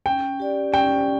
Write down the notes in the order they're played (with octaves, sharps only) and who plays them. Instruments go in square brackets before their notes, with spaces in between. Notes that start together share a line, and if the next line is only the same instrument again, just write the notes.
[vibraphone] C#4 [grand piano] G5
[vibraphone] G4 D5
[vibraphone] C#4 [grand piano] G5